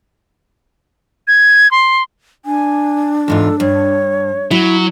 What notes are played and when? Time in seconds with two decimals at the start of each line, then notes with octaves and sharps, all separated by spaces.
1.28 G#6
1.71 C6
2.45 D4 G#5
3.28 E2 G#2 F4 A4
3.60 G2 C#5
4.51 F#3 E4